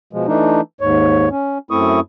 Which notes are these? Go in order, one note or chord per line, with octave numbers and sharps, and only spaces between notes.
B2 F3 G#3
E3 A3 D4 D#4
D#2 G#2 C#5
C#4
F#2 A3 C4 E4 C#6 D#6